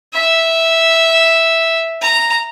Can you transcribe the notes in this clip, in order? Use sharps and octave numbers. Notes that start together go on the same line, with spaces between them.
E5
A#5